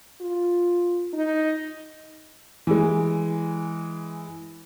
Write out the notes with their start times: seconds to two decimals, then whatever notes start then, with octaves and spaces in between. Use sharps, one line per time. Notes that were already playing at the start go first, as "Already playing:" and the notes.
0.21 F4
1.13 D#4
2.67 E3 G#3